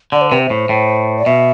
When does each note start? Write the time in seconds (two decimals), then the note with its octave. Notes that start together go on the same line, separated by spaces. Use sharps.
0.12 D3 D5
0.21 C5
0.30 C3 B4
0.39 C5
0.50 A2
0.69 A2
1.18 D5
1.26 B2 E5